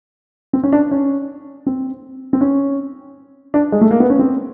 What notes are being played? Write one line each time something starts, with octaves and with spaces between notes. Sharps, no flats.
C4
C#4
D4
C#4
C4
C4
C#4
D4
G#3
A3
A#3
B3
C#4
C4